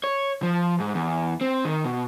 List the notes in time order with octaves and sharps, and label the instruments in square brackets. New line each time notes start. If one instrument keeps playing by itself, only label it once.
[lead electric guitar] C#5
F3
G#2
E2
C4
D#3
B2